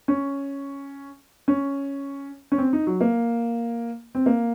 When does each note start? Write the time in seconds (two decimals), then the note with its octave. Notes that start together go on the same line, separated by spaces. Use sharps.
0.08 C#4
1.48 C#4
2.52 C#4
2.58 C4
2.73 D#4
2.87 F#3
3.01 A#3
4.15 C4
4.26 A#3